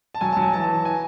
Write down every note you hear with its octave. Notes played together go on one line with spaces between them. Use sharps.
A5
F#3 G#5
F#3 A5
G#5
E3 A5
E3
G#5